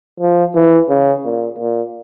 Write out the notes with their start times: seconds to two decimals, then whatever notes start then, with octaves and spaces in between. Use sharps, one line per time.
0.20 F3
0.55 E3
0.89 C#3
1.25 A#2
1.59 A#2